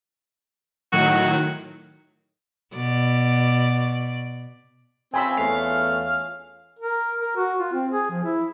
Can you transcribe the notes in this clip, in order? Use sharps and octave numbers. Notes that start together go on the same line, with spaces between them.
A2 D#3 F#3 F#4
B2 D5
C4 C#4 F4 G#4 G#5 B5 E6
E2 A3 G#4 F5
A#4
A#4
F#4
F4
C4
G#4
F3
E4